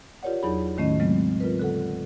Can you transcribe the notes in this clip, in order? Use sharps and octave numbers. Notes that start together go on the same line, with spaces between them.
F4 G4 A#4 C#5 D5 F#5
E2 F#3 D#4 E4 G#4 B5
A2 D#3 A3 C#4 D#5
C#3 F#3 G#3 A3 B3 C4
F4 A#4 B4
D3 A4 F#5